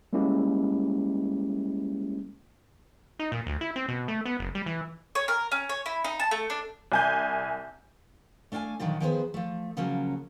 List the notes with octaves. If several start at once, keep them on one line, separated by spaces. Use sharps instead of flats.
G3 G#3 A#3 C#4 E4 G4
D#4
A#2
D2
E4
C4
B2
A3
B3
F#1
G3
E3
C#5
A#4
C#4
C#5
E4
D#4
A5
A3
D4
C2 G#5 G6
A3 D4 F5 G5 G#5
A#2 D3 D#3 F3 F#3
D#3 F3 B3 G#4 B4 C5
F3 A3
C#3 F3 F#3 A#3 C#4